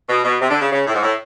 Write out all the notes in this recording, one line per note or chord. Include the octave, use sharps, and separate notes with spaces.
B2
B2
C3
D3
C#3
C#3
A2
G#2
A2